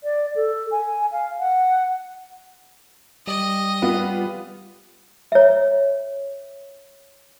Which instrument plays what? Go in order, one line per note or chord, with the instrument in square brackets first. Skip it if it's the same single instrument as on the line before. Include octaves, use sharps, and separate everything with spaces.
[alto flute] D5
A4
G#5
F5
F#5
[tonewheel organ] G3 [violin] D#5
[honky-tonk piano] B3 F4
[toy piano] C#5 E5